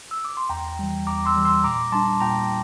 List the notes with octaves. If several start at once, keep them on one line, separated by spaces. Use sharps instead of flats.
E6
D6
C6
E2 G5 A#5
E3 G3
E2 A#5 D6
C6 E6
E3 G3
C6 E6
A#2 A#5 D6
G3 D4 A5 C6
A#2 G5 A#5